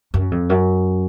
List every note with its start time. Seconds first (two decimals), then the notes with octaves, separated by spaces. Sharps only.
0.14 F#2
0.31 F2
0.50 F#2